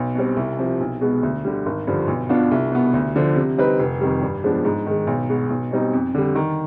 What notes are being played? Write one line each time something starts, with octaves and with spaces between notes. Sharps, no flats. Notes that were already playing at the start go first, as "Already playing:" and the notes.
Already playing: B1
B2 G3 C4
C2
C3 F3
B1
B2 G#3 B3
D2
D3 G3
G#1
G2 D3 F3
B1
B2 B3 D4 F4
C2
B2 B3
D2
D3 F3
C3
G3 C4 D#4 B4
F1
F2 D#3 G3
G2
F3 G#3 B3 D4
G#2
D#3 G#3
B1
B2 G#3 B3
B1
B2 G3 C4 D#4
F2
D3 G3
D#3